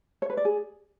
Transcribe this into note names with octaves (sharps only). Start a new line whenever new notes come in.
C#5
B4
D5
G#4